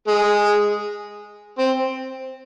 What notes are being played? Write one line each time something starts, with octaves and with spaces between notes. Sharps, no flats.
G#3
C4